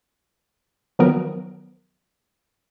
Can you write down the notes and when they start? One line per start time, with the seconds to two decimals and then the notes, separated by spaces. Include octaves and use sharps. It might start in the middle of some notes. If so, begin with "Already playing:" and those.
0.99 D#3 F3 F#3 B3 A#4